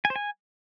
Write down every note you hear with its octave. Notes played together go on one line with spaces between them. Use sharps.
G#5
C5
G#5